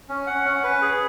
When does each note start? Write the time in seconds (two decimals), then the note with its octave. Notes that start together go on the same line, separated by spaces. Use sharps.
0.09 C#4
0.27 F#5
0.45 C#4
0.64 B4
0.82 G#4